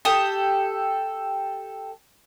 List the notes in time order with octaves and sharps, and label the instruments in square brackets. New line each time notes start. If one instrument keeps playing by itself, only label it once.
[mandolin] G4 A4 D#6